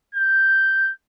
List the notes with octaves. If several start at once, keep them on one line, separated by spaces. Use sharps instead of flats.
G6